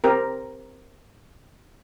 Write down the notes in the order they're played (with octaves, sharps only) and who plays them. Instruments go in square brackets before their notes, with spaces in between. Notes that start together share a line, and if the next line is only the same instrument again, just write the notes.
[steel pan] C4 G4 A#4